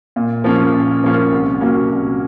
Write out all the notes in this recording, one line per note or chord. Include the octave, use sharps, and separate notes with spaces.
A#2
F3 A#3 C#4 F4
A#2
F3 A#3 C#4 F4
C2
A#2 F#3 A#3 C#4
C2